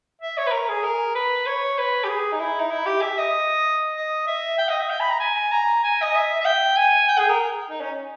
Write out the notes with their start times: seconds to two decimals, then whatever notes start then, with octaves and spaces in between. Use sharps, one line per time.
0.21 E5
0.38 C#5
0.47 B4
0.52 A#4
0.69 G#4
0.83 A#4
1.15 B4
1.47 C#5
1.78 B4
2.04 G4
2.08 G#4
2.32 D#4
2.40 E4
2.60 D#4
2.71 E4
2.86 G4
3.02 E5
3.18 D#5
3.96 D#5
4.27 E5
4.58 G5
4.69 D#5
4.80 E5
4.90 G5
5.00 B5
5.11 A#5
5.20 G#5
5.52 A#5
5.84 G#5
6.02 D#5
6.15 E5
6.40 E5
6.45 G5
6.77 G#5
7.09 G5
7.19 G#4
7.29 A#4
7.70 D#4
7.81 C#4